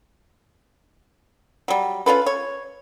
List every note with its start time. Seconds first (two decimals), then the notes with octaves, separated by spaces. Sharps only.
1.68 F#3 G3
2.06 C#4 F4 A4 B4
2.26 C#5